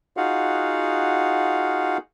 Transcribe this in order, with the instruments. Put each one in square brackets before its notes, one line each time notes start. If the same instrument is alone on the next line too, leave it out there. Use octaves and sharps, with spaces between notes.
[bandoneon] D#4 F4 F#4 G#4 F5 F#5